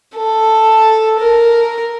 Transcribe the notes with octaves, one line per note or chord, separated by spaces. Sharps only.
A4
A#4